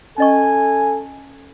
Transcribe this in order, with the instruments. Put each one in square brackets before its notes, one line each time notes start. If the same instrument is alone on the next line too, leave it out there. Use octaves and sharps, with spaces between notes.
[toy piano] C#4 D#5 C#6 [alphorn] A4 [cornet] G#5